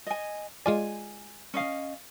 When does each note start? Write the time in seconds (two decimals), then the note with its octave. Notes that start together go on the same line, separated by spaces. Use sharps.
0.07 D#5 G#5
0.66 G#3 F4 D5 G#5
1.54 C#4 D#5 F5